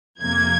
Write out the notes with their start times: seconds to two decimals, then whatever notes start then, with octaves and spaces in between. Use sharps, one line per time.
0.20 F2 C3 F3 A#3 G#6